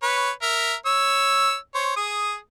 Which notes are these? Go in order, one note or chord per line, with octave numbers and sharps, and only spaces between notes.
B4 C#5
A#4 E5
C#5 E6
C5 C#5
G#4 D#6